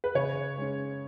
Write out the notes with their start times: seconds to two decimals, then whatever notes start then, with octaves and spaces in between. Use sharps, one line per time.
0.04 B4
0.15 C#3 C#5
0.57 G#3 C#4